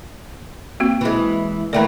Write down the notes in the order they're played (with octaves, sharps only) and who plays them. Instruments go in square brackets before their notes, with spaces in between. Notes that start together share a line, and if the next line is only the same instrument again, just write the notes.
[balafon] A#3 C4 F#4
[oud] E3 G#3
[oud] E3 A3 A#3 [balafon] D5 G5 A#5